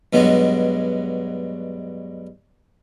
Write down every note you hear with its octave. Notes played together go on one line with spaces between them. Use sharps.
G2 B2 F#3 G#3